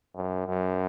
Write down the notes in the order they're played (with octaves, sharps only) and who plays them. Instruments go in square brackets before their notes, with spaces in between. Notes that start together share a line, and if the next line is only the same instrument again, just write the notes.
[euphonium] F#2
F#2